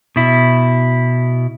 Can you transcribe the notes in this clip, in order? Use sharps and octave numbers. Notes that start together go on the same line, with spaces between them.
B2 E4